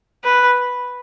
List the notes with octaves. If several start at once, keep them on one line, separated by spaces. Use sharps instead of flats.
B4